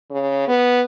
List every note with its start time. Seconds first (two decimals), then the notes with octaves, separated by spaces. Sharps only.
0.10 C#3
0.47 B3